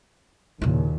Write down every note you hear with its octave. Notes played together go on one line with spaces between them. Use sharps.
D#2 A#2 C#3 E4